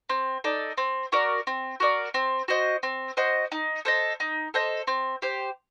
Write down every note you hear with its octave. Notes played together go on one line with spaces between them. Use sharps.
C4
D#4 A4 D5
C4
F#4 A#4 D5
C4
F#4 A#4 D5
C4
F#4 C5 D#5
C4
F#4 C5 D#5
D#4
A4 C5 D#5
D#4
A4 C5 D#5
C4
G4 C5